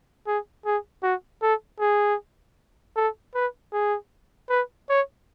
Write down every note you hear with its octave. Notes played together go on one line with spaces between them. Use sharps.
G#4
G#4
F#4
A4
G#4
A4
B4
G#4
B4
C#5